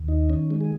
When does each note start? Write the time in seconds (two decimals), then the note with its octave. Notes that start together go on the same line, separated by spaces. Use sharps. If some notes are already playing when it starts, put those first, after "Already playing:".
Already playing: D#2
0.08 D#4
0.29 D#3 C#4
0.50 G#3
0.61 G#4